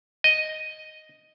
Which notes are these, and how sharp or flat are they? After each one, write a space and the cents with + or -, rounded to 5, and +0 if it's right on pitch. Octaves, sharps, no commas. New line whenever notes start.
D#5 +0